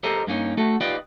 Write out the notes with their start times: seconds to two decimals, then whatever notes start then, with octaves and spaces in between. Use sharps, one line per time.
0.03 G4 A4 A#4 C5 D#5
0.27 G2 A#3 C#4 D#4
0.57 A3 F#4 A4
0.81 D#4 F4 G4 B4 D5 D#5